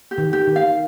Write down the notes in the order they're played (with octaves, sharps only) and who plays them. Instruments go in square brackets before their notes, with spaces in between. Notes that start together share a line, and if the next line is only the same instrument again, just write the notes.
[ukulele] G4
[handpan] D#3
[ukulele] G4
[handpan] D#3
[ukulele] F5